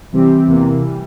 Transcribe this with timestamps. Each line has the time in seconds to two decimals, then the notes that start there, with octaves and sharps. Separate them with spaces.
0.12 C3 E3 G3 C4 G4
0.47 E2 C3 E3 A#3
0.82 E3 G3